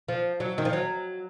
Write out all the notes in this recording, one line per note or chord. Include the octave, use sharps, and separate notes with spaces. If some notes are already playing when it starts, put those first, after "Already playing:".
F3
F#3
D#3
F3
F#3